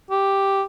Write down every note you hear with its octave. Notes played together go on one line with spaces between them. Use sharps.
G4